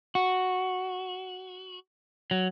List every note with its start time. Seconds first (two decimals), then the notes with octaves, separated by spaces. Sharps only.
0.15 F#4
2.31 F#3